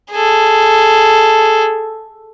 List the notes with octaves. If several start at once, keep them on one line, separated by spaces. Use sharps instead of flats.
G#4 A4